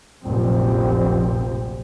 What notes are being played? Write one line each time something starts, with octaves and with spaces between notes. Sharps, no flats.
F1 A#1 F#2 A#2 C4